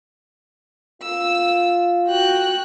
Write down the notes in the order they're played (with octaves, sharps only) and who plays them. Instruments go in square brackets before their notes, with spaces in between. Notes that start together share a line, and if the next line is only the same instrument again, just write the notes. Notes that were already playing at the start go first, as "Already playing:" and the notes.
[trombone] F4 [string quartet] E6
[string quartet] F#4 G5 F#6